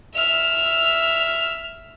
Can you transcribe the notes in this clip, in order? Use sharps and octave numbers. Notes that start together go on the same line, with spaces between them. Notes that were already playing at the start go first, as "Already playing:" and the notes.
E5 F6